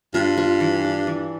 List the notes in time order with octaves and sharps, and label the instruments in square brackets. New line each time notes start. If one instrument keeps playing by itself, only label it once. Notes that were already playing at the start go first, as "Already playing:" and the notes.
[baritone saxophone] G2 [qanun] F4
[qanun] F4
E3
D4
E3